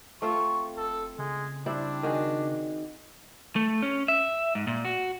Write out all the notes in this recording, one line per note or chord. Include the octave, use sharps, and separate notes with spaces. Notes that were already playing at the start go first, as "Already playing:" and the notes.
A3 C4 F4 C#6
F1 A4
C#3 G#3
G3 C4 D4 E4
D#3 F#4 G#4
A3
C#4
E5
G#2
A#2
F#4